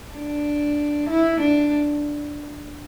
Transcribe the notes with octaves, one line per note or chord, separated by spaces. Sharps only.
D4
E4
D4